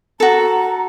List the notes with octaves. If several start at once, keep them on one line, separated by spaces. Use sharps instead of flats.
F#4 A4 A#5